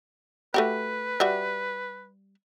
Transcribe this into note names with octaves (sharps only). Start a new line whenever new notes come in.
A3 F#4 G4 B4
G3 F#4 E5